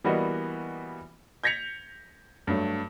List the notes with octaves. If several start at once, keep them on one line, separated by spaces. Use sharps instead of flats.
E3 G3 A#3 B3 F#4 D#5
G6 G#6 A#6 B6 C#7 F7
G2 F#3 A3